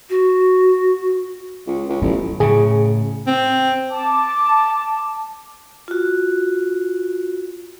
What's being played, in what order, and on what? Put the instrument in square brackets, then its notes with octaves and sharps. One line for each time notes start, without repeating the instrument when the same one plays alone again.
[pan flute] F#4
[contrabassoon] C#2
C#2
[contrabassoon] A1 [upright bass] F#3 B3
[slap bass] A2 C#3 [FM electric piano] G#4
[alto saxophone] C4
[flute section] A5 D6
[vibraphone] F4 F#4